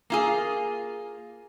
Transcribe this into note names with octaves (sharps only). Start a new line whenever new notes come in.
A#3 F4 G#4